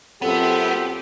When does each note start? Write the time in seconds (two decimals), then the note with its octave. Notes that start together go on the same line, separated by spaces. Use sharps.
0.22 F#2 C3 B3 C4 F4 G4 A4